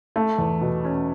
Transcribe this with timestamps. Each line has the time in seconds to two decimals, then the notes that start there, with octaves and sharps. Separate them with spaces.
0.16 A3
0.38 E2
0.61 B2
0.84 C#4